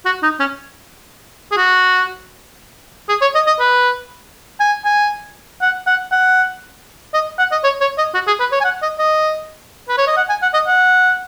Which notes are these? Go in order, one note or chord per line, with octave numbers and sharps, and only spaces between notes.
F#4
D#4
C#4
G#4
F#4
G#4
C#5
D#5
D#5
B4
G#5
G#5
F#5
F#5
F#5
D#5
F#5
D#5
C#5
C#5
D#5
F#4
G#4
B4
C#5
G#5
F#5
D#5
D#5
B4
C#5
D#5
F#5
G#5
F#5
D#5
F#5